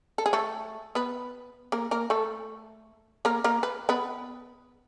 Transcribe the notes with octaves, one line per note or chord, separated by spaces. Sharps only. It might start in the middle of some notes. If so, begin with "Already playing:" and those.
A4
G#4
A3 A4
B3 B4
A#3 A#4
A#3 A#4
A3 A4
A#3 A#4
A#3 A#4
B4
B3 B4